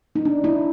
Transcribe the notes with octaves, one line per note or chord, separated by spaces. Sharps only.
D#4
D4
E4